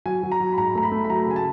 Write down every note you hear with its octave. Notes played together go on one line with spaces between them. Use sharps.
F#3 G#5
F#3
A#5
F#3
B5
G#2 A#5
A3 A#5
B5
A3
B5
F#3 A#5
C#3 G#5
A5